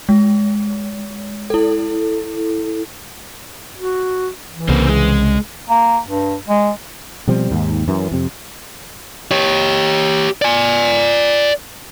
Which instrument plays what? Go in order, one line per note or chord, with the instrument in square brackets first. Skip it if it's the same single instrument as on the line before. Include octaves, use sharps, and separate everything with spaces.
[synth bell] G#3
E4 A4
[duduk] F#4
E3
[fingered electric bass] C2 C#3 [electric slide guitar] A#3 C4
[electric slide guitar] G#3
[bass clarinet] A#3
G2
G#3
[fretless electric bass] B2 F3 G3 C4
D#2 G#2
F#2 E3
F2 C3
[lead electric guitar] G4 C#5
D5 G#5